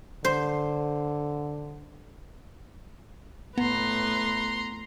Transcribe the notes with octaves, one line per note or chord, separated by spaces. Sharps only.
D3 C5
A2 B3 B4 A#5 C6